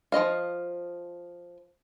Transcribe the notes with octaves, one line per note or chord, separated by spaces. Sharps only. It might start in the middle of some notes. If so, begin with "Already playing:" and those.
F3 F4 D#5 F5